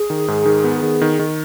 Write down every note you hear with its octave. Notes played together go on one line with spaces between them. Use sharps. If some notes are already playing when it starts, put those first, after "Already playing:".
Already playing: G#4
D#3
G#2
D#3
B3
D#3
D#3
D#3